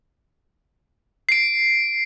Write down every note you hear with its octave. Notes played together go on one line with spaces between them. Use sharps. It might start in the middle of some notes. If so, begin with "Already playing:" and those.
C7 D7